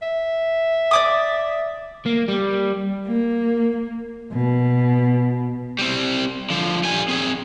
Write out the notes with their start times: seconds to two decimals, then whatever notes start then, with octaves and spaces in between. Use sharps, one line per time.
0.02 E5
0.91 D5 D6 D#6
2.06 A#3
2.28 G3
3.07 A#3
4.32 B2
5.79 G3 C4
6.50 D3 F3
6.84 G3 G#5
7.08 C4 G#4